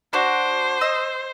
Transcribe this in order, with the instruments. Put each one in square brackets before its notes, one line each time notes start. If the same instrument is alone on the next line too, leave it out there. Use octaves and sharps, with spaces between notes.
[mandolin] D4 F#4 [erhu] C5
[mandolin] D#5 D#6 E6